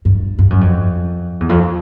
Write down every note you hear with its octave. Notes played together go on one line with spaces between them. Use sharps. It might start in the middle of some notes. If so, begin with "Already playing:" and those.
G2
G2
F#2
F2
E2
F2